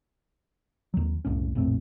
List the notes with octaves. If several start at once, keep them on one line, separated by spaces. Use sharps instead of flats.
D#2 F#3
F#1 C2 A2 C#4
F1 A#1 A2 C4